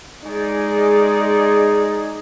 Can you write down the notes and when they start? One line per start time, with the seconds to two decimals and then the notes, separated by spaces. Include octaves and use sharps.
0.25 G#3 D#4 G#4 D5